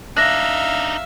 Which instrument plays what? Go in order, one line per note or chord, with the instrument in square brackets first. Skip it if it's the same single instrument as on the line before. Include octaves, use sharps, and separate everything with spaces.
[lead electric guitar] D4 D#4 [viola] E5 F5 [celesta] F#6 A#6